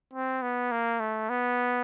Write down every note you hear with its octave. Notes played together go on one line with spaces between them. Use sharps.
C4
B3
A#3
A3
B3